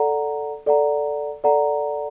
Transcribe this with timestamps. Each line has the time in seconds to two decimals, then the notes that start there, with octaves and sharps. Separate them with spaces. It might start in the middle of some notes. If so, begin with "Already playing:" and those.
Already playing: A4 D5 F#5 A#5
0.66 A4 D5 F#5 A#5
1.44 A4 D5 F#5 A#5